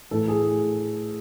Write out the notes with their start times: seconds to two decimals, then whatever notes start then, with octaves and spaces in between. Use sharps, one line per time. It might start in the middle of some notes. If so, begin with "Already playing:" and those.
0.11 A2 E3 A4
0.28 G#4